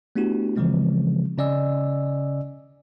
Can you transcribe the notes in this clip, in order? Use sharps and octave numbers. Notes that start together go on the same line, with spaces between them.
A3 B3 D4 E4 F#4 G4
C#3 E3 F3 G#3 C4
C#3 C#4 D5 D#5 G#5 E6